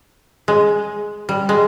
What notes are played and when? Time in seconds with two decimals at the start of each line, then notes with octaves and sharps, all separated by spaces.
0.48 G#3
1.29 G3
1.49 G#3